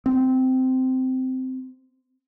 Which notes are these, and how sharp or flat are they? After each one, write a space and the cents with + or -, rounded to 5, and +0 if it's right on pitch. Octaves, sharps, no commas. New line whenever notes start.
C4 -15